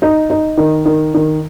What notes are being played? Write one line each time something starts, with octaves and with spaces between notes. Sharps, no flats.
D#4
D#4
D#3
D#3
D#3